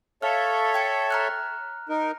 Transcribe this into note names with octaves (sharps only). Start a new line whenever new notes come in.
A4 C#5 E5 F5 F6
G5 G#6 C#7
A#5 F6 F#6
D#4 A#4